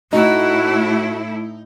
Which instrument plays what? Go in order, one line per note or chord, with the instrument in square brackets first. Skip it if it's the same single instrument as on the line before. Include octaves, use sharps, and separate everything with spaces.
[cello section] A2 A3 E4 [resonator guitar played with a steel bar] D#4 [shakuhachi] F#4